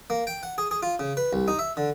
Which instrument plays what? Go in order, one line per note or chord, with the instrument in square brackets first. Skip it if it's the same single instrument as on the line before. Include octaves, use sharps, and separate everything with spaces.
[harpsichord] A#3
G5
F#5
G#4
G#4
F4
C#3
B4
C2
D#4
E5
D3